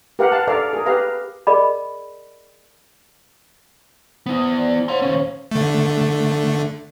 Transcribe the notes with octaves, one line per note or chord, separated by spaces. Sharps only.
G4 A#4 B4 F5 F#5
F5 A5
A4 A#4 D5 F5
G#4 A#4
G4 B4 F5 A#5
G#4 A#4 D5 D#5 B5
B3 E4 C5 D#6
C5 D5
C5 C#5 F5 F#5 C6
D#2 C#4
D3 A3